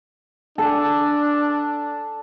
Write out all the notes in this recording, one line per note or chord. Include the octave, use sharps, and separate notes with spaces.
D4 A4